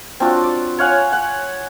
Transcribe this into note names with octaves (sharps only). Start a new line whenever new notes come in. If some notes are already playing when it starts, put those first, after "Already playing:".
C4 D4 F4 F#4
D5
C#5 F5 F#5 G#5
F#5